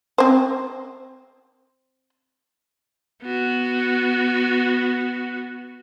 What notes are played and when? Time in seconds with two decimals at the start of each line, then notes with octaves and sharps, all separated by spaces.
0.18 C4 C5
3.23 B3 F#4